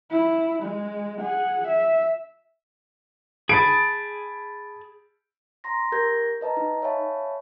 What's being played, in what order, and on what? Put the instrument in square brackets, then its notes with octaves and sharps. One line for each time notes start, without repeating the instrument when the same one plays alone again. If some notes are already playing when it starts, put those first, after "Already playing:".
[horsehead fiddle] E4
G#3
G#4 F#5
E5
[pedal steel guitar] G#4 A5 [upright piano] B5 D7
[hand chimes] A#5 C6 A#6
G4 A#4 G6 G#6 A#6
B4 D#5 A5 A#5
D#4 D#5
C#5 E5 F5 G#5 A5 B5